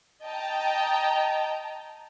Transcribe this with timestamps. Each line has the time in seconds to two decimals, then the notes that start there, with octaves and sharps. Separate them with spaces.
0.25 D#5 G5 A5 A#5